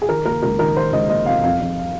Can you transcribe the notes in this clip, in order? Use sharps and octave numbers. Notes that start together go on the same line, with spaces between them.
G#4
D#3 A#4
A#3 A#4
C#2 A#4
D#3 A#4
D#3 C5
C#2 D#5
A#3 D#5
C3 F5
F2 F5
F2